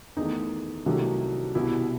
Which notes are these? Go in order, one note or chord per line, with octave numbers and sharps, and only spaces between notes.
E2 D#3 A3 D#4
C2 C3 D#3 F#3 A3
C2 B2 G3 E4